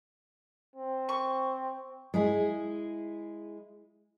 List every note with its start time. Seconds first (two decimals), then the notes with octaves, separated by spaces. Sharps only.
0.76 C4
1.09 C#6
2.14 G#3 E4 G#4